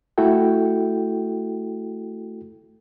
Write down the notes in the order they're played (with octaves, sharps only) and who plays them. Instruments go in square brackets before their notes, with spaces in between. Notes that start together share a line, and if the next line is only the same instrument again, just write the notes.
[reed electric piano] A3 E4 F#4 A4 G5